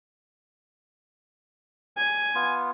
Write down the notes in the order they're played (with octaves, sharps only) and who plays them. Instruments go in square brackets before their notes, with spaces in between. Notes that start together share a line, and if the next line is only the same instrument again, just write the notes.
[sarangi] G#5
[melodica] B3 F4